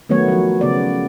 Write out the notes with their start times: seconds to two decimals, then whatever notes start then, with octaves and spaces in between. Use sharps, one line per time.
0.09 D#3 F#3 A3 B3 C#5
0.28 F3 F#3
0.61 C#3 B3 D5